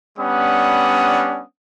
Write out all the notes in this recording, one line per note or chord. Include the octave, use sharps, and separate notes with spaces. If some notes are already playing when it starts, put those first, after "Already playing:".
G3 B3 C#4 D4 F#5 D#6